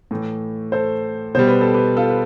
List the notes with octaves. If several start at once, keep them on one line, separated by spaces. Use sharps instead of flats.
A2 E3 A3
A4 C5
B2 G3 C5
B4
A4
G4 B4
F4 A4
B4